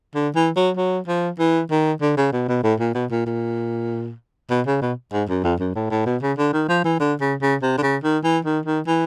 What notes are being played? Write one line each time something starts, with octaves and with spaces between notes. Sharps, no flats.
D3
E3
F#3
F#3
F3
E3
D#3
D3
C#3
B2
B2
A2
A#2
B2
A#2
A#2
B2
C#3
B2
G#2
F#2
F2
F#2
A2
A2
B2
C#3
D3
D#3
F3
E3
D3
C#3
C#3
C3
D3
C#3
D#3
E3
D#3
D#3
E3